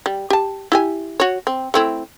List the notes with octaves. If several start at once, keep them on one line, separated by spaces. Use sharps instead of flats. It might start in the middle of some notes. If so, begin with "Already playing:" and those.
G3
G4 A5
E4 G4 G#5
F#4 C#5
C4
A3 C4 E4